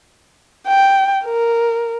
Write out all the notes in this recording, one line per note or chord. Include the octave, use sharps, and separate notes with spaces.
G5
A#4